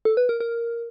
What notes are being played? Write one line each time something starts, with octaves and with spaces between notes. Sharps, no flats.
A4
B4
A#4
A#4